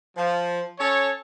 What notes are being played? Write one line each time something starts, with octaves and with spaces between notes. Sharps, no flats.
F3
C#4 A4 C#5